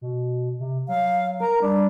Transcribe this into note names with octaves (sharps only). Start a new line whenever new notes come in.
B2
C3
F#3 F5
A#4 A#5
G3 D4